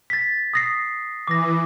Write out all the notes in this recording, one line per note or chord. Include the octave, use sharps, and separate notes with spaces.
A6 B6
D#6 A#6 C7
E3 D6 A#6